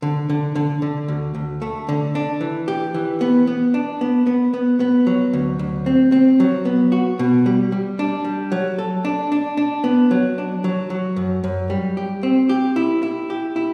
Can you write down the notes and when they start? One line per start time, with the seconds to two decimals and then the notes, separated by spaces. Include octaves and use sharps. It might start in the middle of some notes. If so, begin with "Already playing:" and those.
0.02 D3
0.30 D3
0.55 D3
0.82 D3
1.08 D2
1.35 D2
1.62 A3
1.89 D3
2.15 D4
2.41 E3
2.68 G4
2.94 E3
3.21 B3
3.47 B3
3.74 D4
4.01 B3
4.27 B3
4.54 B3
4.80 B3
5.07 F#3
5.33 D2
5.59 D2
5.86 C4
6.12 C4
6.40 F#3
6.65 B3
6.92 F#4
7.19 B2
7.46 G3
7.72 G3
7.99 D4
8.25 G3
8.52 F#3
8.79 A4
9.05 D4
9.32 D4
9.57 D4
9.84 B3
10.11 F#3
10.38 D4
10.64 F#3
10.90 F#3
11.16 F#2
11.44 F#2
11.70 G3
11.97 G4
12.23 C4
12.49 G4
12.76 E4
13.03 E4
13.30 G4
13.56 E4